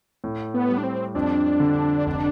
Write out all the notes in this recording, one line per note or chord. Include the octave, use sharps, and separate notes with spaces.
A2
B3
G3
D4
C4
F2 D4
D3
F1